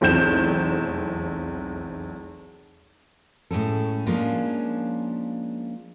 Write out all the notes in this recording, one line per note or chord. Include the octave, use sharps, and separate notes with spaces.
F1 B1 E2 C4 G6 E7
A2 G#3 C#4 A4
F3 G#3 A#3 C#4 D4